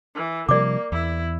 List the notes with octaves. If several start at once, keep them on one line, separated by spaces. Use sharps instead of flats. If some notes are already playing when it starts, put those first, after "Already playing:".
E3
C3 F3 G3 A#3 D5 D6
E2 E4